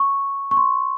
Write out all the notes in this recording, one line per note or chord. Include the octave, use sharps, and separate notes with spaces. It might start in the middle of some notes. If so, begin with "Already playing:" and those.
Already playing: C#6
C#6
C6